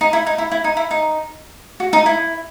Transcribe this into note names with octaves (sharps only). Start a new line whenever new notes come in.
D#4
E4
D#4
E4
E4
D#4
E4
D#4
F#4
D#4
E4